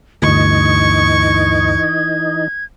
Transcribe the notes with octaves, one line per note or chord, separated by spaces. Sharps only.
D2 G2 E3 D#4 D#5 C#6 G#6